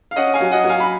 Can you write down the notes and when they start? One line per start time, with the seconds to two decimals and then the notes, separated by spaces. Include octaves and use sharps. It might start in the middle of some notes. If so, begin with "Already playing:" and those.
0.11 F5
0.16 C#4 D#5 F#5
0.34 F5 G#5
0.40 F#3
0.51 D#5 F#5
0.64 F#3
0.69 F5 G#5
0.80 B5